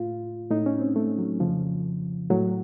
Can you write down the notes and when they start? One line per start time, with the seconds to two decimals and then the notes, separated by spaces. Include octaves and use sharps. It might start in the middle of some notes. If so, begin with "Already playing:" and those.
Already playing: A2 F4
0.51 A2 D#4
0.66 C#4
0.81 C4
0.96 A3
1.19 F#3
1.40 F2 C#3 F3
2.30 A2 F#3